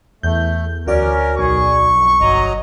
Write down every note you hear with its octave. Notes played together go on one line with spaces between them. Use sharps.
E2 A3 G6
D2 C#4 F#4 A#4 D5
B1 G#4 C#6
F2
G1 F#3 D#5 A#5